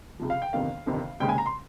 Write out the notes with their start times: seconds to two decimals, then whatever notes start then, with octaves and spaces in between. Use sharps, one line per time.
0.20 C#2 C3 F3
0.30 F5
0.42 G5
0.53 G1 F2 C3 D#3 F5
0.86 G1 F2 C3 D#3
1.20 F1 D#2 C#3 G#3 G5
1.29 G#5
1.38 A#5
1.46 C6